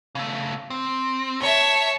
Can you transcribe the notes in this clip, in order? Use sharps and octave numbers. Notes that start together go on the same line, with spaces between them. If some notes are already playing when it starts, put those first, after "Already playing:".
C#3 A3
C4
D2 C#5 E5 A5